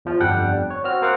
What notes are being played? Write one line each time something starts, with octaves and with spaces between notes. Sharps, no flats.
E2 F3 F4
G1 F2 G3 D4 F#5 G5
C#5
C4 F#4 F6
A#3 C4 F5 F#5